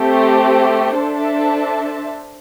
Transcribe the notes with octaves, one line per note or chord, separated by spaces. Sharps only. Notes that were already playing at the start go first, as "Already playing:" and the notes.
Already playing: A3 C4 G4
D4 A4 C5 E5 A5